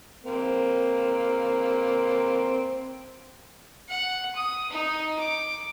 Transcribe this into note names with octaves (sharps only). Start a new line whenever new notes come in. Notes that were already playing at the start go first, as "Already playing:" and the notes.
A#3 C4
F#5
D#6
D#4
D6